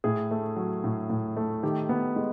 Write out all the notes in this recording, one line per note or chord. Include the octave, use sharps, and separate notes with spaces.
A2 G#4
A3
F#3
A2
A2
A3
D#3 G4
B3
G#3